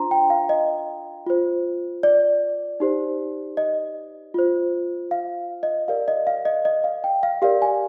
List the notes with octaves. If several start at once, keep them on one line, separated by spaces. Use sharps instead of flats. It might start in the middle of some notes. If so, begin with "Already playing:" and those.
Already playing: D4 F4 C5 A#5 C6
G5
F5
D#5
F4 C5
D5
D#4 G4 C5
D#5
F4 C5
F5
D#5
G4 A#4 D5 F5
D#5
F5
D#5
D#5
F5
G5
F5
G4 A#4 D5 F5
G#5